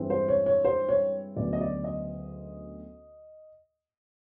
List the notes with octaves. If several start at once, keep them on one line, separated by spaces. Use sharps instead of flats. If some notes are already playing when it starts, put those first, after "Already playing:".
Already playing: G2 E3 G#3 C4
C5
C#5
C#5
C5
C#5
D2 C#3 F#3 B3 D5
D#5
D5
D#5